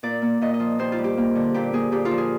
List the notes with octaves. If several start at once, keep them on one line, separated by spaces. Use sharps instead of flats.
A#2 D5
A#3
A#2 D#5
D#5
F3
D#2 C5
F4
G3
G4
A#3
D3
A#2 G4
A#3 G#4
A#2 G4
F4
F3
G#4